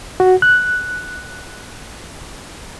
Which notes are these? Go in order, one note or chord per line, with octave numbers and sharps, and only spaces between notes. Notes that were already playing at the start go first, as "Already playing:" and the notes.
F#4
F#6